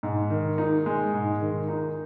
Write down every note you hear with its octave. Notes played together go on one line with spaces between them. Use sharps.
G#2
D#3
D#4
G#3
G#2
D#3
D#4